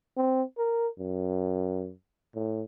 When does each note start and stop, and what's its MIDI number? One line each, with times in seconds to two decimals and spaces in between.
0.17 0.43 60
0.58 0.88 70
0.99 1.92 42
2.35 2.65 45